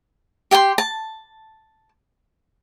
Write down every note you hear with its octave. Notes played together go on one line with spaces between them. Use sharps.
G4 G5 A5 C6
A5